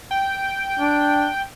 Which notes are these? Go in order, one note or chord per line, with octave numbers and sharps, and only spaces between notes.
G5
D4